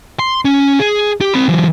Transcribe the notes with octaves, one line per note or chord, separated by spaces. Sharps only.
C6
C#4
G#4
G4
C4 B5
E3 F#3